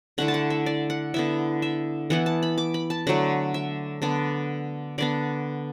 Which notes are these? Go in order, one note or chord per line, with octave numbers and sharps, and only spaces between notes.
D3 A3 E4 F#5
A5
F#5
E5
D5
F#5
D3 B3 E4 E5
E5
E3 B3 E4 F#5
A5
B5
D6
B5
A5
D3 F#3 A3 F#5
E5
D3 B3 D4
D3 B3 D4 D5